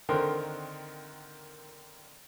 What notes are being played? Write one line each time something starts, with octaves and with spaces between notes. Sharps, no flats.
D3 D#3 C4 A#4 G5 C6